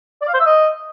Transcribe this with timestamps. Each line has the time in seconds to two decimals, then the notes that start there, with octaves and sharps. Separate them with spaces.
0.22 D5
0.28 F5
0.34 C5
0.40 E5
0.46 D#5